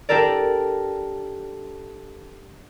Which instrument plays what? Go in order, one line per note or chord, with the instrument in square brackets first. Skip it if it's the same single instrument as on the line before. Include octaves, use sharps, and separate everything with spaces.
[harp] D4 G4 A4 A#4 D5